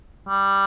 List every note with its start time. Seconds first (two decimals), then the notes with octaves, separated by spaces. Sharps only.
0.29 G3